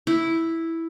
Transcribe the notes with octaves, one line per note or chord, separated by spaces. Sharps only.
E4